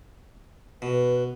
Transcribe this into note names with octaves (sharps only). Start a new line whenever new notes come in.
B2 B4